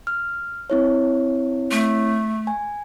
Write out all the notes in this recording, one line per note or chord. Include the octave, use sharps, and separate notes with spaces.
F6
C4 E4 C#5
A3
G#5